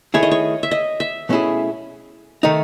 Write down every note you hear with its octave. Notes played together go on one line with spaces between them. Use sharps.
D#3 A3 E4 G#4 C#5
D#5
C#5
E5
D#5
E5
B2 A3 C#4 E4 G#4
D#3 A3 D#4